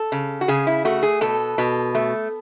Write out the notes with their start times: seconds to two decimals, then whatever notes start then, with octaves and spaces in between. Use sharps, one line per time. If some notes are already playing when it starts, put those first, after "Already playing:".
Already playing: A4
0.12 C#3
0.41 F#4
0.48 C#3 G#4
0.67 E4
0.85 A3 F#4
1.03 G#4
1.21 B2 A4
1.58 B2
1.95 A3